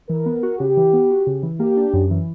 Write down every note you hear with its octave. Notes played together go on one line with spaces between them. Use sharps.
E3 A#4
B3
F#4
C#3 G4
E3
B3
F#4
C#3
E3
A#3 G4
D4
F#2
E3